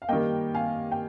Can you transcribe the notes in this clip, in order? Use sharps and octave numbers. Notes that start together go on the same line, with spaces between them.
F5
D#3 G3 A#3 D#5 G5
F5 G#5
G5